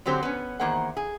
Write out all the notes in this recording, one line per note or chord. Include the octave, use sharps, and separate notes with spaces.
D3 F#3 C4 G4 C5
B3 C#4
E2 D#3 A#3 G#4 C5 F#5
G#4